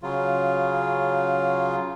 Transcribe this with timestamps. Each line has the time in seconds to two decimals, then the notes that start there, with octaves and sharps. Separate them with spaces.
0.03 C#3 F#3 F4